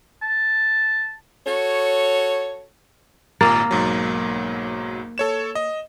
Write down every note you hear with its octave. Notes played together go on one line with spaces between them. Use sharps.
A5
F#4 A4 C#5
G#1 A#2 A#3 A6
B1 G#2 F#3
A4 C#5 E7
D#5